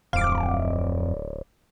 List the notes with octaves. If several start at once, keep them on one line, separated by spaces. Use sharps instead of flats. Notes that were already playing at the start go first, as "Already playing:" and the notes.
D1 F2 F5 D6